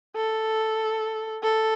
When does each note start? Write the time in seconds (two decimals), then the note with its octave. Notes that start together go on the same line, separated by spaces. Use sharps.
0.16 A4
1.43 A4